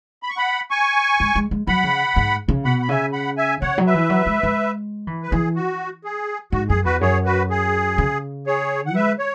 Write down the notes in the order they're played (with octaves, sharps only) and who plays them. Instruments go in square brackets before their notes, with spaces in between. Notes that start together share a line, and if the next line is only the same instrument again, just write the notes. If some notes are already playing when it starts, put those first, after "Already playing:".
[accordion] B5
C#6
F#5 B5
G#5 C#6
[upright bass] G#3
G#3
G#3
[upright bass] F#3 [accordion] F#5 B5
[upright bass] C#3
G#2
C#3
[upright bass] B2 [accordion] F#5 B5
[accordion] B5
[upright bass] C#3 [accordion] E5 G#5
[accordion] F#5 B5
E5 G#5
[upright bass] C#3 [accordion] C#5 F#5
[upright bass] F#3
[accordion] B4 E5
[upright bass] E3
F#3
G#3
G#3
E3
[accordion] B4
[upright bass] E3 [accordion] G#4
[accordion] F#4
G#4
[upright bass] G#2 [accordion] F#4
[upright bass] F#2 [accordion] G#4
[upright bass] E2 [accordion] F#4 B4
[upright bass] F#2 [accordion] G#4 C#5
[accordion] F#4 B4
G#4
[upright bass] C#3
[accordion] G#4 C#5
F#5
[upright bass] G#3 [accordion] B4 E5
[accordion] C#5